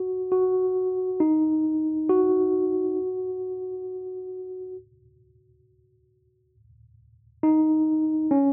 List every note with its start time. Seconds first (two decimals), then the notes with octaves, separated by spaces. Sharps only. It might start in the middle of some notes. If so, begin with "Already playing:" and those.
Already playing: F#4
0.32 F#4
1.20 D#4
2.09 F#4
7.43 D#4
8.31 C#4